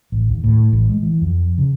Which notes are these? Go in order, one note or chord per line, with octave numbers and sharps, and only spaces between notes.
A1
D#2
A2
A1
G#3
E3
F2
C#3